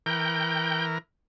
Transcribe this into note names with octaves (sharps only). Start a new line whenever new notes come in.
E3 A#4 G5 G6